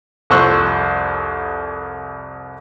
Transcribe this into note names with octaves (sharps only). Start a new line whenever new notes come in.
C2 F2 C5 C#6 E6 F#6